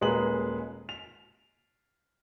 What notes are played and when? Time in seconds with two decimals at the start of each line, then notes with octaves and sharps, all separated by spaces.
0.01 D#1 G#3 A#3 G#4 B4 F#7
0.89 F7